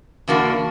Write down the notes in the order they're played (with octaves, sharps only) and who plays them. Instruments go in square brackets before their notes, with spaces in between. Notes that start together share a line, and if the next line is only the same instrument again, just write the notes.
[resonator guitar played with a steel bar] E2 D3 A#3 D4 F#4